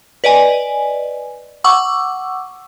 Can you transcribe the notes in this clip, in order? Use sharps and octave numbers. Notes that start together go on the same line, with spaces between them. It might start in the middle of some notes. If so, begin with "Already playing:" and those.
B4 D5 D#5 G#5
F#5 C#6 D6 E6